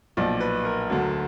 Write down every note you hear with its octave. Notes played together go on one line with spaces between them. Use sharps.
B1 A#2 F3 D5
B4
A#4
D2 D3 F#3